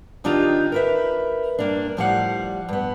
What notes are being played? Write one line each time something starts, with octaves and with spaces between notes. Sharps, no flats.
D#3 D4 D#4 F4 G4
A#4 B4 E5
G2 A#3 D4
A2 F3 G3 G4 F5 F#5
G2 B3